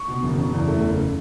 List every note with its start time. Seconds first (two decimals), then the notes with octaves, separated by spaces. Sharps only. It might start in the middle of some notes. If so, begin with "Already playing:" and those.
Already playing: C#6
0.08 B2
0.23 F#1
0.38 F#1
0.54 E2
0.68 A3
0.83 F#1